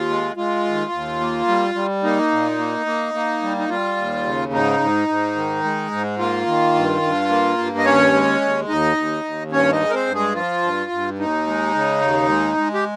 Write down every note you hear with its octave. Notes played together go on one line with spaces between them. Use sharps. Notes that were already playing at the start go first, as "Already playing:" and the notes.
Already playing: D#2 F4
G#3
G#3 F4
D#2
D#2
A#3
G3
G3
A#3 D#4
A#2
A#3
A#3
A#3
G3
D#4
G3 F4
D#2
C#3
G#2 D#4
G#2
G#2
D#3
G#3
G#2
A#3 F4
D#3
G2
G2
A#3
G2
D#5
D#2 C#4 C#5
G#3
D#2
D#2 D#4 D#5
D#2
D#2
G2 C#4 C#5
D#4 D#5
G#3
A#4
C4 C5
G2
G#3 G#4
F3 F4
G2
G2
D#2 D#4
G#3
C#3
D#2
G#3
G#3
G4